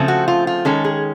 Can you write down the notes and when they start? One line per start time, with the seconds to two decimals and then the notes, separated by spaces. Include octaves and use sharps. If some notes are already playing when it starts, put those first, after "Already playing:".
Already playing: C#3 F3 A3 C4
0.08 F#4
0.28 F4
0.47 F4
0.65 D#3 G#3 C#4 A4
0.84 G#4